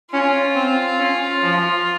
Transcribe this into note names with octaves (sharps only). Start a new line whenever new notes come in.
C#4 F4
C4
C#4
F3